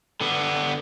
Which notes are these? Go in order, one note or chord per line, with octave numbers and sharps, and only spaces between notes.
D3 B3